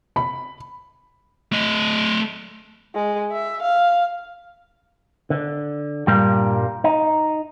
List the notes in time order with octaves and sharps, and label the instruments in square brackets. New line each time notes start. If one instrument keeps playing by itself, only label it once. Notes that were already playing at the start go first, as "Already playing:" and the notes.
[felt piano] B5
[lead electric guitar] A3 D#5
[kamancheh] G#3
E5
F5
[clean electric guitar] D3
G2 A#2 G3 A#3
D#4